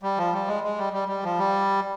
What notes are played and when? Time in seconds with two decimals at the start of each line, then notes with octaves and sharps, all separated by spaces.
0.03 G3
0.18 F3
0.33 G3
0.48 G#3
0.63 G#3
0.78 G3
0.93 G3
1.08 G3
1.23 F3
1.39 G3